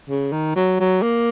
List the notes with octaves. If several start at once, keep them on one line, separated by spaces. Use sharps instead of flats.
C#3
D#3
F#3
F#3
A#3